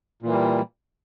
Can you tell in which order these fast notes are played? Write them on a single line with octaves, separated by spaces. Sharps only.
A#2 E3 A#3 G3